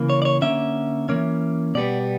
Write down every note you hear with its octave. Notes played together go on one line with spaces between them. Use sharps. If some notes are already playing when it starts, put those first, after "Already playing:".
Already playing: C#3 E3 A#3
C#5
D5
C#5
D3 A#3 C#4 E5
E3 A#3 C#4
B2 G3 B3 D5